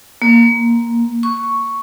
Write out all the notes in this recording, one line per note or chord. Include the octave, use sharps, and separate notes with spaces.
A#3
C#6